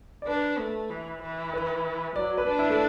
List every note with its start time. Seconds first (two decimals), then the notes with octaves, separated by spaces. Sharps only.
0.22 D5
0.27 D4 B4
0.59 A3
0.90 E3
1.22 E3
1.54 B4
2.16 F#3 D5
2.38 B4
2.48 D4
2.59 E4
2.70 A3